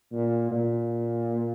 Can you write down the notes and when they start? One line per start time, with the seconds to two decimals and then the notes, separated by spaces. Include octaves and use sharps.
0.12 A#2
0.51 A#2